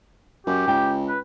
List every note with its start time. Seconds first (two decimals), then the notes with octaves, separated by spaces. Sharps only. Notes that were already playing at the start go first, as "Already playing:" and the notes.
0.47 F#2 G4
0.68 C#2 G5
1.08 B4